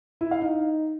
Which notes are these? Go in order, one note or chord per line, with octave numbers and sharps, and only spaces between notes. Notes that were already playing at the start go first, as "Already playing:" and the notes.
E4
F5
D#4